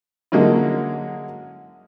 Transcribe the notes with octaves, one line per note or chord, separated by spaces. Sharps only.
D3 F#3 G#3 A#3 C#4 E4